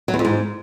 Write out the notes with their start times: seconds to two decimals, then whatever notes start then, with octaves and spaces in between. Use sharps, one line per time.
0.08 F#3
0.14 E2
0.19 F2
0.25 G#2